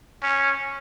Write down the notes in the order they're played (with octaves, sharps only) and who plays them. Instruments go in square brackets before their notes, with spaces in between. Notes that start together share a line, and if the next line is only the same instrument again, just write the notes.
[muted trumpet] C#4